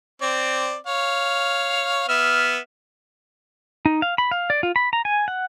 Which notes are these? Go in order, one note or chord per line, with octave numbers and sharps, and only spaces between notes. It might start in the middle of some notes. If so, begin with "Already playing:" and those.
C4 D5
C#5 F5
B3 E5 F6
D#4
F5
B5
F5
D5
F4
B5
A#5
G#5
F#5